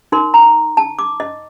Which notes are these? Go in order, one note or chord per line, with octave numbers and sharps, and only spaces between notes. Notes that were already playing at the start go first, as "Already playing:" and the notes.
D#4 A#4 C6
A#5
A5
D6
D#5